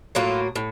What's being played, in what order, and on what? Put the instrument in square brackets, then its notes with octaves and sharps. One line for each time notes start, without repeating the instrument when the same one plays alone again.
[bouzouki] A2 F#3 A#3 F4
A2